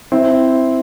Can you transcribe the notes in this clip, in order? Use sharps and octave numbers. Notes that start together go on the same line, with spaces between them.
C4 E4